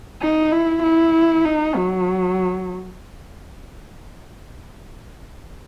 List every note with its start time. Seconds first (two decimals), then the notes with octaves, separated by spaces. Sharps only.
0.21 D#4
0.52 E4
0.83 E4
1.45 D#4
1.76 F#3